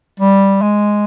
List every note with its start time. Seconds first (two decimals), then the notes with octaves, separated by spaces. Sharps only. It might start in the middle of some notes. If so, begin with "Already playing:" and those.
0.20 G3
0.62 G#3